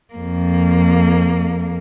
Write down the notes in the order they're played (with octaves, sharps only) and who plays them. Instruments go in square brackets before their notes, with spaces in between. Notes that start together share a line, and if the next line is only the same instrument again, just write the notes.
[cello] F2 A#3